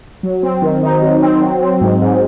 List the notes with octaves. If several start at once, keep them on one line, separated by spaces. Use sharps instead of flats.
F#3
C4
D#3
D#4
F#3
C4
F#3
C4
G#2
G#2